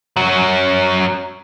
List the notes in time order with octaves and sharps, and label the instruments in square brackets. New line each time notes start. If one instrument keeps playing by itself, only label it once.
[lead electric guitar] F#2 F#3